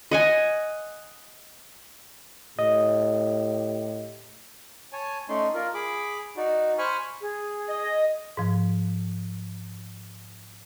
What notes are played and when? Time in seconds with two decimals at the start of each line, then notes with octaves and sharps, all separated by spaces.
0.11 D#5 F#5 G#5
2.59 A2 G4 D#5
4.93 C#5 G#5 A5
5.29 A3 C#4 D#4 D5 C6
5.54 F4 A#4 D5
5.74 G#4 B5 D6
6.37 D#4 F#4 D5
6.78 C5 G#5 B5 C#6 F6
7.21 G#4
7.69 D#5
8.37 G#2 F3